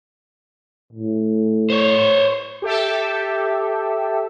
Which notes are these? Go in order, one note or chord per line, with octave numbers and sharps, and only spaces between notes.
A2
C5 C#5
G4 A4 E5